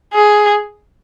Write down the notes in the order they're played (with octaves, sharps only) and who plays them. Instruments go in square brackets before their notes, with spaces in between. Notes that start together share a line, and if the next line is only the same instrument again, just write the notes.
[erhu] G#4